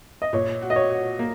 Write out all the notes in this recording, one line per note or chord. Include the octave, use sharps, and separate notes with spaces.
D#5
A#2 C#5
F#4
D#5
C#5
F#4
A#3